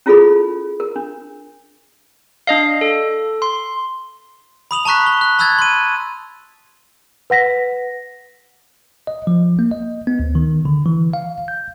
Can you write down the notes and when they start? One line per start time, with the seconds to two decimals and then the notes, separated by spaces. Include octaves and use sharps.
0.06 C#4 E4 F4 G#4 A4 B5
0.80 A#4
0.96 D4
2.47 D4 D#5 F5
2.81 A4
3.42 C6
4.71 B5 D#6 F7 F#7
4.85 A5 A#5 C#6 F#6 B6
5.06 G7
5.21 F#6
5.39 A5 B5 E6 F#6 G#6 A6
5.58 C6 D#7
7.30 B4 F#5 A#6 B6
9.07 D#5
9.27 F3
9.59 A#3
9.71 D#5
10.07 B3
10.19 D2
10.35 D#3
10.65 D3
10.86 E3
11.13 F5
11.48 G6